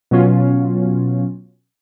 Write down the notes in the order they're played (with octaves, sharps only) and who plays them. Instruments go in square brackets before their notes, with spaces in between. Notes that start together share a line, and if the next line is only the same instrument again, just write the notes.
[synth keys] B2 F#3 C#4 F4